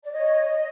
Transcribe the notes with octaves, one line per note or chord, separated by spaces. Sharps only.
D5
C#5 D#5